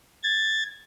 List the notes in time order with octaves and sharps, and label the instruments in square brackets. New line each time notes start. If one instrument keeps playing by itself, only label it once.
[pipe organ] G#6 A6